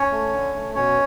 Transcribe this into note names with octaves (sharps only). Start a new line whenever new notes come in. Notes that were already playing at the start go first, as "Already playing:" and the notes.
Already playing: C#4 C#5
A3
D3
A3
B2 C#4 C#5